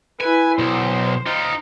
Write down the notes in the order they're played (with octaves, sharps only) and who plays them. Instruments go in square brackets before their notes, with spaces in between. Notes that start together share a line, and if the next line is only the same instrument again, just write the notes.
[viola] E4 B4 [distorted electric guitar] G#5
[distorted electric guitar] B1 [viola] C5
[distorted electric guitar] D#4 F4